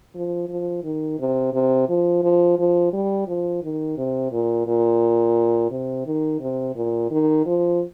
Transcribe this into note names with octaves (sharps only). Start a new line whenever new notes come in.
F3
F3
D#3
C3
C3
F3
F3
F3
G3
F3
D#3
C3
A#2
A#2
C3
D#3
C3
A#2
D#3
F3